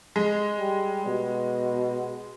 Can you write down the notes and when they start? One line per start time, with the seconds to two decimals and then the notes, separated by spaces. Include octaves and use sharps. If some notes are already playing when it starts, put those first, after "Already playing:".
0.16 G#3
0.58 G3
1.06 B2